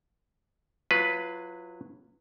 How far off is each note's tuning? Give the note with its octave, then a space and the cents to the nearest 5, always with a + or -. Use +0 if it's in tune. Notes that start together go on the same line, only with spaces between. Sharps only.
F#3 -20 F4 -20 B4 +0